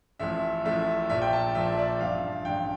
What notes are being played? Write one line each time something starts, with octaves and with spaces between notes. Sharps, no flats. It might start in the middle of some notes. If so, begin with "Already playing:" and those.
A1 A2 F3 E5
A1 A2 F3 E5
A#1 A#2 F3 E5
G5
A5
A#1 A#2 F3 E5
D5
A1 G2 F3 F5
A1 G2 F3 G5